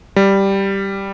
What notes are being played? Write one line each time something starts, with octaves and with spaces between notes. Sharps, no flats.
G3